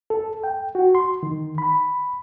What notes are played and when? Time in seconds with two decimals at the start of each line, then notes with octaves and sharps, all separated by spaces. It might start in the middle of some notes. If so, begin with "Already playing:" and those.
0.10 A4
0.44 G5
0.75 F#4
0.95 C6
1.23 D#3
1.58 B5